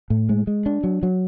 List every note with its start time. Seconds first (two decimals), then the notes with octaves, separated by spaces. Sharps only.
0.10 A2
0.29 G#3
0.47 G#3
0.66 D4
0.84 F#3
1.03 F#3